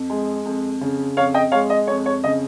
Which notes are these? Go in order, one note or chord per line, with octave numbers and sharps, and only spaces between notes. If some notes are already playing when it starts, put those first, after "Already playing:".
Already playing: F2
G#3
F2
C#3
F2 C#5 F5
D#5 G5
G#3 C#5 F5
D#5
F2 C#5
C#5
C#3 D#5